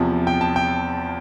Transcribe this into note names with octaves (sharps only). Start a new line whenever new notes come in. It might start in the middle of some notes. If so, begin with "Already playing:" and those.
Already playing: E2 C3 F3 A5
G5
A5
G5